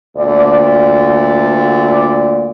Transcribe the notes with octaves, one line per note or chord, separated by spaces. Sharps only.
D2 A#2 D5